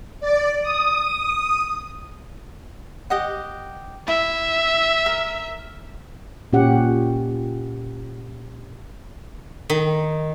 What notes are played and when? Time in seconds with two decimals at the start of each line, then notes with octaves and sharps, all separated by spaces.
0.20 D5
0.63 D#6
3.10 G4 D#5 F#5
4.08 E4 E5
5.06 A#4
6.53 A#2 C#4 G4 F#5
9.70 D#3